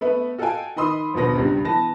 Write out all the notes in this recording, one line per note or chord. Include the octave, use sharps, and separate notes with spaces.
A3 B3 B4 E5
F#4 A4 D#5 F5 G5 G#5
D#3 D#5 B5 C6 D#6 E6
D#1 D2 B2 B3 A#6
C#2 G2 G3
E3 B3 B4 A5 A#6